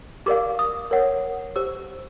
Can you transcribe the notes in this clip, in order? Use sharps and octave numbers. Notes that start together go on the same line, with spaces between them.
G4 A#4 D5 F5 D6
D#6
A#4 C#5 F#5
G4 C5 E6